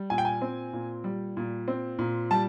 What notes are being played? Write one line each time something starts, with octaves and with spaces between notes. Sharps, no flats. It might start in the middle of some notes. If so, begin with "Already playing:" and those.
Already playing: G3
A#2 G#5
G5
G#5
C4
A#2
G3
A#2
C4
A#2
G3 A5